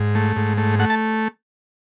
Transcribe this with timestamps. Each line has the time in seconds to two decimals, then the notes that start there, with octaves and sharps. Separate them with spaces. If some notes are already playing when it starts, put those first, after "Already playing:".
Already playing: G#2
0.15 A3
0.36 G#2
0.57 A3
0.79 A3 F#5
0.90 A5